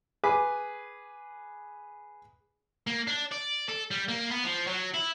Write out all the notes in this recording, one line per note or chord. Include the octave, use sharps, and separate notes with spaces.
G#4 B4 D6
A#3
D4
D5
A4
G3
A#3
B3
F3
F#3
E4